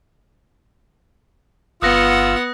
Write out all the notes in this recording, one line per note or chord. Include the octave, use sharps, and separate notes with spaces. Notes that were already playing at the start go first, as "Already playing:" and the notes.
G1 B3 F4 F#5 D#6 E6 F#6 A#6